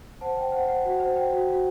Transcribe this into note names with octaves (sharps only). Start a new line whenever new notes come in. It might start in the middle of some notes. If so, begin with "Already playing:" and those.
C5 F#5 A5
C5 G5
C5 F#5
C5 F#5
F#4 F#5
C5
C5 G5
F#4
F#4